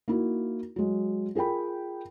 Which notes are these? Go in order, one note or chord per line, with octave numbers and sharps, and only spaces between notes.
A#3 D#4 E4 F#4
F#3 G#3
F4 G#4 A#4 G5 B5